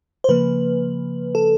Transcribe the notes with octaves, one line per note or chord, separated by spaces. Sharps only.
C5
C#3 F3 A#3 B4
A4